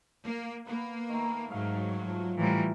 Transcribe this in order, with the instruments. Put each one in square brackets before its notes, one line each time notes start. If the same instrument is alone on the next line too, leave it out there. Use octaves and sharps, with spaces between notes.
[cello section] A#3
[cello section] A#3 [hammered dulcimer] B3 B4
[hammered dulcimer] D#3 A3
[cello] G#2 [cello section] F#3 [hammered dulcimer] F5
[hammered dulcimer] F3
[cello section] A2 [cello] E3 G3 [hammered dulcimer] E4 F4 A#4